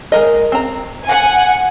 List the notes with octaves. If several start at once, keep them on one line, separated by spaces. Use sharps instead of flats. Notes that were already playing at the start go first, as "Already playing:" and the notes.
G#3 A#4 D#5
C4 A#5
F#5 G#5